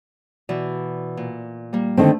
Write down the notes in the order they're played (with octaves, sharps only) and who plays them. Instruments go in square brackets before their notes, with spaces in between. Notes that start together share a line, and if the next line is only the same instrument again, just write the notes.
[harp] B2 E3 D5
A#2
G3 A#3
[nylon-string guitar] D3 D#3 C4 [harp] A3